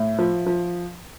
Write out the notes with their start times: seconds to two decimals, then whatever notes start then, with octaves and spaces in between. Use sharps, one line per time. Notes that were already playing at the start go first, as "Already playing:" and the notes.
Already playing: A2
0.18 F3
0.46 F3